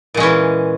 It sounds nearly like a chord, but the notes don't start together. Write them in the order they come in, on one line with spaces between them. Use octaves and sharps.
A#2 G#3 C#4 E3